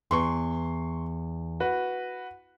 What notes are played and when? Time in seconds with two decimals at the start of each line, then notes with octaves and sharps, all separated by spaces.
0.11 E2 C6 C#6
1.60 F#4 B4